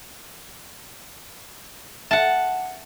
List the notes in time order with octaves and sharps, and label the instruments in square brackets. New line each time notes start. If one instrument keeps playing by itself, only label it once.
[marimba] E5 [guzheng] F#5 A5